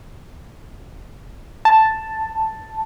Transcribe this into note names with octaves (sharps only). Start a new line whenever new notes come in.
A5